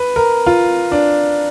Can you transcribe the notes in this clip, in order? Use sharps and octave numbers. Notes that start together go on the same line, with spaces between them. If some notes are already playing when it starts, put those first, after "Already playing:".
Already playing: B4
A#4
F4
D4